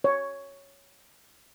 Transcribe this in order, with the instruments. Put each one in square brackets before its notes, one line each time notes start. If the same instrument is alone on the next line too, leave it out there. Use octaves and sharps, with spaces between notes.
[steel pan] C#5